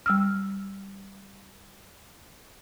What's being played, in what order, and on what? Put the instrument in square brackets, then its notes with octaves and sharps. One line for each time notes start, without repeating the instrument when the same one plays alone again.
[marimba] G3 E6 F6